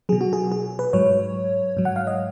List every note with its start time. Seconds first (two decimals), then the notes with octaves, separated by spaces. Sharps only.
0.09 B2 F#3 G#4
0.21 F#4
0.33 G#4
0.52 G#4
0.79 B4
0.93 G#2 F#3 C#5
1.77 G#2 F#3
1.85 F#5
1.96 F5
2.07 D#5